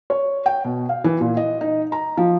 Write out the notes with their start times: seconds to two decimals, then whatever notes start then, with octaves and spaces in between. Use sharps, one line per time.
0.10 C#5
0.46 G5
0.65 B2
0.89 F5
1.04 E3
1.21 A#2
1.37 D#5
1.61 D#4
1.92 A#5
2.17 F3